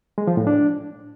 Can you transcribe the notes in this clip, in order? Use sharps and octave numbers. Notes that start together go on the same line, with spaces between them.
G#3
F3
A2
D4